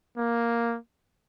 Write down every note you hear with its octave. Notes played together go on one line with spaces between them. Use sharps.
A#3